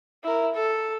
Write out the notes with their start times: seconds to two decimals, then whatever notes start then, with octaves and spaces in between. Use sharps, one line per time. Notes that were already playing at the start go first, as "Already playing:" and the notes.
0.23 E4 A#4
0.54 A4